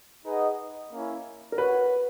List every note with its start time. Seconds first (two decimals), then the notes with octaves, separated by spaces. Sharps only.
0.25 D#4 G#4 B4 D#5 F#5
0.91 A#3 C#4 E4
1.52 A#4
1.58 F#4 B4 C#5 F#5